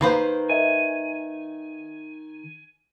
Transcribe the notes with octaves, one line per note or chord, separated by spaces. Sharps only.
D#3 A#3 B4 C5
A#4 D#5 E5 G#5